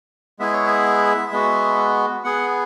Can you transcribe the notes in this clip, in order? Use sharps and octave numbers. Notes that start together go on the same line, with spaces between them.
G#3 B3 E4 G#4 E5
C#5
E5
G#3 B3 F#4
B3 G#4 F#5